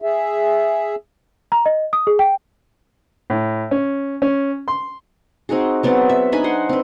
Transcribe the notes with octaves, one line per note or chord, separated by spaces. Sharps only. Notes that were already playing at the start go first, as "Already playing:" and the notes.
G#4 E5
A#5
D#5
D#6
G#4
G5
A2
C#4
C#4
C6
C4 D#4 F#4 G#4
F#3 B3 C4 D5
E5
D4 D#4 G#5 B5
C5 F#5 C6
C4 B4